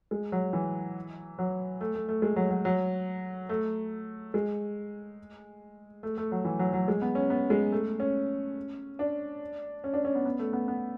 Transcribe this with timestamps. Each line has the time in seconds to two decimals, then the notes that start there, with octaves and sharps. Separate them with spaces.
0.11 G#3
0.32 F#3
0.53 E3
1.39 F#3
1.81 A3
1.95 A3
2.09 A3
2.22 G#3
2.36 F#3
2.50 F#3
2.65 F#3
3.49 A3
4.34 G#3
6.03 A3
6.18 A3
6.32 F#3
6.45 E3
6.59 F#3
6.73 F#3
6.88 G#3
7.02 B3
7.15 C#4
7.30 B3
7.50 G#3
7.72 A3
8.00 C#4
8.99 D4
9.84 C#4
9.94 D4
10.05 C#4
10.15 B3
10.25 B3
10.39 A3
10.53 B3
10.68 B3